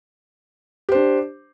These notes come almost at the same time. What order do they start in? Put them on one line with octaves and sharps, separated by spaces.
G4 C5 D4